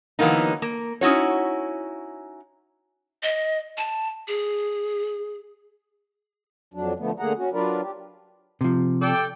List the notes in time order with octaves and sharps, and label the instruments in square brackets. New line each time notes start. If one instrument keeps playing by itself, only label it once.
[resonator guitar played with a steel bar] D3 E3 F#3 A#3 B3 D#4
A#3
C#4 D#4 E4 F#4 C#5
[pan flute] D#5
A5
G#4
[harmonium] F2 F#3 D4
D3 F3 A3 B3
D3 A3 A#3 G#4 F#5 A#5
C#4 F#4
F#3 D4 F4 A#4 B4 D5
G4
[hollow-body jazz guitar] C3 F3
[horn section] A4 D5 G5